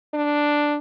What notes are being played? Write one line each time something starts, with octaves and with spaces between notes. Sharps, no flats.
D4